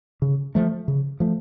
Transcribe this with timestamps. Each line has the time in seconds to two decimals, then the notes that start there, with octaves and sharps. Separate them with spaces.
0.22 C#3
0.55 F3 A3
0.88 C#3
1.20 F3 A3